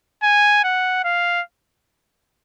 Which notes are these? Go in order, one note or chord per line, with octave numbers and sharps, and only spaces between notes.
G#5
F#5
F5